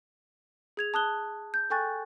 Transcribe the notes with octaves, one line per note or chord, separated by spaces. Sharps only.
G#4 G#6 F7
A5 D#6 F#6 G7
G6
A4 G5 G#5 C#6 F#6 A6